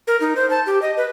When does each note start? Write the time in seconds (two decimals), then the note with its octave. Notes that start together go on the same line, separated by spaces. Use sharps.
0.07 A#4
0.21 D#4
0.36 C5
0.50 A5
0.66 G4
0.82 D#5
0.97 B4